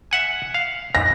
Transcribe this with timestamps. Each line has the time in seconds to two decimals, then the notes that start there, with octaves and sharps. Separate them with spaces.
0.11 E5 F#5 G#5
0.54 F5
0.95 A#6